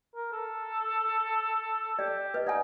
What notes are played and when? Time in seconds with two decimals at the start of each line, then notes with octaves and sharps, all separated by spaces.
0.16 A#4
0.32 A4
1.99 G4 D5
2.34 B4 D#5
2.47 D#4 D5 F#5 G#5